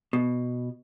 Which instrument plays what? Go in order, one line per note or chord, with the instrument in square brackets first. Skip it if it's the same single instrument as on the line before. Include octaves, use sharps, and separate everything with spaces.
[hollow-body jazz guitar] B2